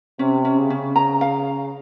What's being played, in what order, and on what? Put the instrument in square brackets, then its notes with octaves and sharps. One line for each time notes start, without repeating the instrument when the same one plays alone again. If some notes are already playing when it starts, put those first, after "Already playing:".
[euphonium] C3 [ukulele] C#4
[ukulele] C#4
[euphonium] C#3
[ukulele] C#4
A#5
F5